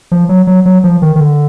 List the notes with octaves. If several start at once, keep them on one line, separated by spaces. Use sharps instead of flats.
F3
F#3
F#3
F#3
F3
D#3
D#3
D3